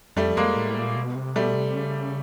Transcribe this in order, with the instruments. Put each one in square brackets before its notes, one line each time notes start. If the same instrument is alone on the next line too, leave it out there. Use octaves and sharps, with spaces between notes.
[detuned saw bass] F2 [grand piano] G3 A3
[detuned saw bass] F2 [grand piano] G#3 A#3
[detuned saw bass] A2
A#2
B2
C3
[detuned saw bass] B2 [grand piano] G3 A3
[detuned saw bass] C3
C#3